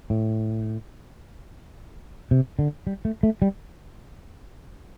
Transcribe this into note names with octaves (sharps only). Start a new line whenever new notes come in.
A2
C3
D3
G3
A3
A3
G3